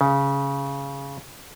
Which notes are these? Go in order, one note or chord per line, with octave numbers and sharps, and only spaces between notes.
C#3